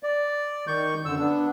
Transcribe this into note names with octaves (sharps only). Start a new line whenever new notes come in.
D5
D#3 C#6 G6
F#2 D3 E6
B3 D4